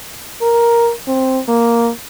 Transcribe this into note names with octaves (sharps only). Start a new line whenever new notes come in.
A#4
C4
A#3